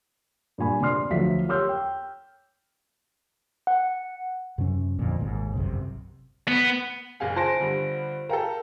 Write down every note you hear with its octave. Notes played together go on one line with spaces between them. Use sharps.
G2 A#2 G#5 B5
C3 D4 D5 C6 F6 C7
D2 F3 F#3 F#4 E5 B6
G4 C#5 C6 E6 F6 G6
G5
F#5
F#2 C3 F#3 C#4
F2 A#2 D3
G#1 D#2 G#2 C3
G1 C2 F#2 C3
B3
F#1 G#4 F5 G#5
F4 C5 A5 C6 A#6 D7
G2 D3
A4 A#4 F5 G5 A#5